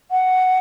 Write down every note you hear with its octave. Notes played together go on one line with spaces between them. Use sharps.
F#5